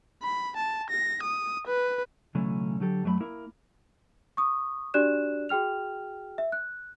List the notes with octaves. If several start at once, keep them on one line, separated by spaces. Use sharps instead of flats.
B5
A5
A#6
D#6
B4
B1 C#3 E3 F#3 A3 C#4
D3 F#3 G4 A4
F#2 F#3 A3 C#5 B5
A#3 E4 A#4
C#6 D#6
D4 F#4 G4 D5 F#6 E7
F#4 G#4 G5 F6 F7
E5
F#6